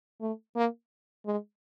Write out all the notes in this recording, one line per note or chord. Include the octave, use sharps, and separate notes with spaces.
A3
A#3
G#3